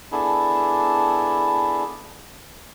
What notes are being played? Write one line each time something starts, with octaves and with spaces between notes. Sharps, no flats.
B3 D4 E4 G#4 A4